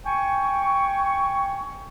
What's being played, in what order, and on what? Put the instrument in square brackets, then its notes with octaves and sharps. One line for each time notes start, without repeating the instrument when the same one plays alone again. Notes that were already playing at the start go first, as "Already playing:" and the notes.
[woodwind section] G5 G#5 C#6